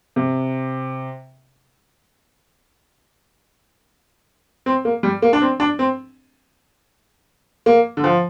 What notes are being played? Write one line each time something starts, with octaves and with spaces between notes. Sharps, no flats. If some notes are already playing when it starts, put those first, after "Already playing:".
C3
C4
A#3
G3
A#3
D4
C4
D4
C4
A#3
D3
F3